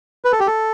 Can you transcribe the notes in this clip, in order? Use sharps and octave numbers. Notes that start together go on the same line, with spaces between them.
B4
A4
G4
A4